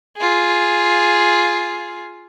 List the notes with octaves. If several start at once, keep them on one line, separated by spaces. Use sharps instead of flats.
F4 G#4